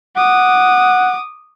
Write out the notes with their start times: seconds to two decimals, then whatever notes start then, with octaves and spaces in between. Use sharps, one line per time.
0.16 F#5 D6 D#6